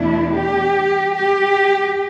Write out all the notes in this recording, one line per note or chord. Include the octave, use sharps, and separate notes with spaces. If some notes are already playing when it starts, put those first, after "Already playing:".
Already playing: E2 B2 A3 D4 E4
G4
G4